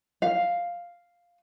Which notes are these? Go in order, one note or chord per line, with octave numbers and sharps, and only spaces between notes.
F5